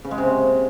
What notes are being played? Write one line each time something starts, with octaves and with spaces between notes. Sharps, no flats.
C#3
G#3
C3